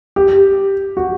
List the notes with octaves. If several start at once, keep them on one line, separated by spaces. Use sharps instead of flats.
G4
F#4